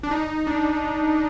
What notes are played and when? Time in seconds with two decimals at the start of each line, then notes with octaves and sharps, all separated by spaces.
0.03 D4
0.11 D#4
0.47 D4